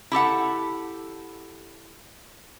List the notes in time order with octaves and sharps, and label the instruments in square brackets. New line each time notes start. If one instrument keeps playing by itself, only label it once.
[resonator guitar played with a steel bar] E4 G4 A4 F#5